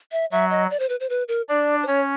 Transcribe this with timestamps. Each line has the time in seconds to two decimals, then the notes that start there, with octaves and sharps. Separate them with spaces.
0.12 E5
0.32 F#3 E5
0.50 D#5
0.70 D5
0.80 C5
0.89 B4
1.00 C5
1.10 B4
1.28 A#4
1.49 D4 D5
1.83 C5
1.87 C#4 C#5